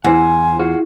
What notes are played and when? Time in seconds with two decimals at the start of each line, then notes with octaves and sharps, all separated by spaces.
0.04 E2 E4 C5 F#5 G#5
0.59 F4 F#4 G#4